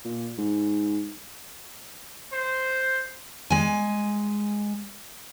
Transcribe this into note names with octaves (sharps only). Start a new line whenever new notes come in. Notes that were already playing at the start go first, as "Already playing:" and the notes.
A#2
G#2
C5
G#3 G#5